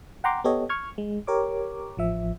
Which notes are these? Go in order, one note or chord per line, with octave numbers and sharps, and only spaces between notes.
F#5 G5 A#5 C6 D6
B3 G4 A4 C#5 D#5
C#6 F6 G#6
G#3
G4 A#4 C#5 D6
A1 F3 E5